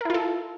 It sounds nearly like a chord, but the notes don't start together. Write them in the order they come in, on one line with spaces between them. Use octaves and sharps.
A#4 E4 F4 A4